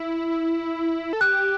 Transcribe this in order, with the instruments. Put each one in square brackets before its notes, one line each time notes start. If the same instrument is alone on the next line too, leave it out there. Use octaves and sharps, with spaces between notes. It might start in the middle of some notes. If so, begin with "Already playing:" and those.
Already playing: [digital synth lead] E4
A4
[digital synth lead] G4 [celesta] F#6